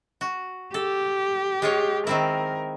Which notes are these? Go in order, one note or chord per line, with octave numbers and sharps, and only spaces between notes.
F#4
G4 A4
G#3 F4 C#5
D#3 C4 E4 A#4